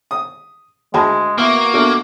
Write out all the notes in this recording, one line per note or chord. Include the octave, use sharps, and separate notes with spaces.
D#6
D2 G#3 G#4 A5 B5
A#3 B3 E4 F#4
B2 D3 A3